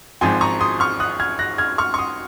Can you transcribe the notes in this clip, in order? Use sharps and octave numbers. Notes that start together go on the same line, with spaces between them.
G#1 G#2 F3 C4 G#5 C6
A#5 C#6
C6 D#6
C#6 F6
D#6 F#6
F6 G#6
F#6 A#6
F6 G#6
C#6 F6
C#6
C6 D#6